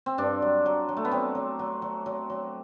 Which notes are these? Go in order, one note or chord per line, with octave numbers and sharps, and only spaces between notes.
C4
G2 D4
F#3
F#3
F#3
A3
B3
F#3 C4
F#3
F#3
F#3
F#3
F#3